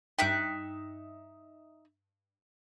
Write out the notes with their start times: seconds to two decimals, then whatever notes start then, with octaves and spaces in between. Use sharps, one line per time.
0.19 G2 D#4 E5 G5 F#6